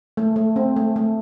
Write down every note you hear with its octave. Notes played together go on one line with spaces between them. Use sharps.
A3
A3
C4
A3
A3